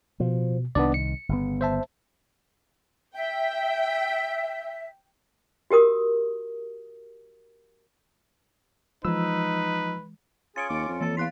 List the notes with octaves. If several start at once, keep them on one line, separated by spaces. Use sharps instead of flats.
B2 F3
C2 D#3 B3 D4 D5
C#7
G1 C#3 B3
C5 E5 A5
E5 G5
F#4 G4 A#4 D#6
E3 F3 G#3 D#4 B4 E6
C#4 F4 G#4 A6 C#7 D7
D#2 D6
F2
E3 A4 A6
E2 F5 C6 F#6 B6